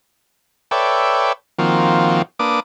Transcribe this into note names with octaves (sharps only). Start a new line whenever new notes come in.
A4 B4 C#5 D5 E5 G5
D#3 F3 A#3 C4 F4 F#4
A#3 D4 B4 D6 D#6